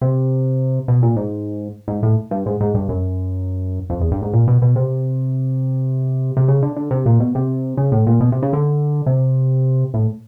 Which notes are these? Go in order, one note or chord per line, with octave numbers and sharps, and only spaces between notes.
C3
B2
A#2
G#2
G#2
A2
G2
G#2
G#2
G2
F#2
F2
E2
G2
G#2
A#2
B2
B2
C3
C3
C#3
D3
D3
C3
A#2
B2
C3
C#3
A2
A#2
B2
C3
C#3
D3
C3
A2